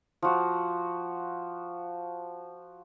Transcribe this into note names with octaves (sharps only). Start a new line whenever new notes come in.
F3 F#4